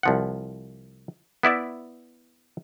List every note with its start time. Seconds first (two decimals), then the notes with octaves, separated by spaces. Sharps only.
0.03 C2 F3 F#5
1.43 B3 E4 D5 E5